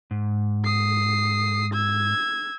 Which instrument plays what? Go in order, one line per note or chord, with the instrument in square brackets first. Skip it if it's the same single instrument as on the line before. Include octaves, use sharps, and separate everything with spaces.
[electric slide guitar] G#2
[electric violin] D#6 C7
E6 G#6